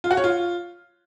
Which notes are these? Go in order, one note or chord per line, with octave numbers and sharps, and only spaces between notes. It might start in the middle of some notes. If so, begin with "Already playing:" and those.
F4
F#4
C#5
F4